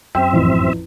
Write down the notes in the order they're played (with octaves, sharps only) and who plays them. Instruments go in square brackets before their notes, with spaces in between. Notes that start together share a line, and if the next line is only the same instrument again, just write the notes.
[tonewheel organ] F#2 C4 E5 [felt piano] G5
[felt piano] A1 F2 E4